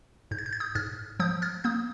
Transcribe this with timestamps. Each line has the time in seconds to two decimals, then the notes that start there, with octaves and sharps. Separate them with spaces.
0.31 G#2 G6
0.38 G#6
0.46 G6
0.53 G#6
0.60 D#6 G6
0.75 G#2 F6 G#6
1.20 F3 D#6 G6
1.42 F6 G#6
1.64 A#3 D#6 G6